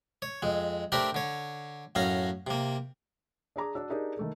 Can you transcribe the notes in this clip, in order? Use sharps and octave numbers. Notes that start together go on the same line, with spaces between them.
C#5
F2 G#3
A3 C4 D4 G4 A#4 B5
D3 C#5
F#2 A2 C#4 F5 A#5
C3 A#3
D4 G#4 A#5 D6
D4 F#4 E6
D4 D#4 G4 G#4 A#4
D#3 A3 A4